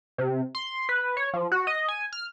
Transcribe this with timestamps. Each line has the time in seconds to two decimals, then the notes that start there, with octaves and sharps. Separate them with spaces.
0.18 C3
0.55 C6
0.89 B4
1.17 C#5
1.34 F3
1.52 F#4
1.67 D#5
1.88 G#5
2.13 F6